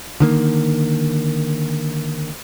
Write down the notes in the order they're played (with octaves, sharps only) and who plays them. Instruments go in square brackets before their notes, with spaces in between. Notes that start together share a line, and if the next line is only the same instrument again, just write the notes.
[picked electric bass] D3 D#3 A#3